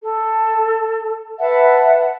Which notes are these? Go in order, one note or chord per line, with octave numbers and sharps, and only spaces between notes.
A4
B4 E5 F#5 A5